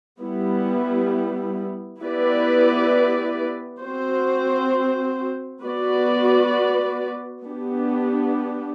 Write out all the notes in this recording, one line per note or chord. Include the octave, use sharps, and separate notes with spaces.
G3 B3 E4
B3 E4 G4 B4 D5
C4 F#4 C5
B3 F#4 B4 D5
B3 D4 G4